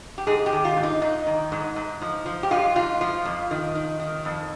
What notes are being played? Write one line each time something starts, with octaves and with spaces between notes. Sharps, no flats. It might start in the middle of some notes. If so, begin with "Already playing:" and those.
G4
G#2 G#4
G4
D#3
F4
G#2
D#4
G#2 D#4
D#3
G#2
G#2
F3
F3
G4
G#2 F4
G#2 F4
F3 F4
F2
D#3
D#3
D#3
F2